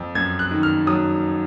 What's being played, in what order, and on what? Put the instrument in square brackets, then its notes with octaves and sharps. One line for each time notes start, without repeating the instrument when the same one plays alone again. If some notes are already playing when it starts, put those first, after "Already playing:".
Already playing: [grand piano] F2
F#2 G#6
F#6
D#3
F6
F#3 D#6